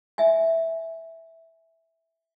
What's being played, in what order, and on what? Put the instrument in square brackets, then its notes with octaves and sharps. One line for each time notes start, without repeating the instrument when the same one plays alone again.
[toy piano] E5 G#5